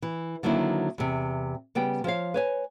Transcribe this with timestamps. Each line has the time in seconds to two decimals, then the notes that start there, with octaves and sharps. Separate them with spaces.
0.02 E3
0.43 D3 D#3 F#3 A#3 C4 E4
0.98 E2 C3
1.75 C#3 G3 B3 G5
2.04 F3 C5 C#5 F5
2.34 B4 C#5 G#5